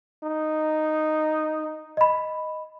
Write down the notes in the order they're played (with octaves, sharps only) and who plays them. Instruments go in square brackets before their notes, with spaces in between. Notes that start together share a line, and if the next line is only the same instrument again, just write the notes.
[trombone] D#4
[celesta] D#5 B5